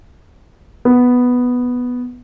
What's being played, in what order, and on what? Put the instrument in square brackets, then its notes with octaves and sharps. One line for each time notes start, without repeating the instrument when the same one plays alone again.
[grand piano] B3